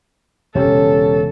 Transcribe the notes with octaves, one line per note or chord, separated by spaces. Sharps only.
E1 C#3 C#4 G4 A4 C#5